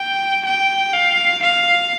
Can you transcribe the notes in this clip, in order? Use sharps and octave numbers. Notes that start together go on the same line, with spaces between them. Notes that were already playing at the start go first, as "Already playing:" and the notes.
Already playing: G5
G5
F5
F5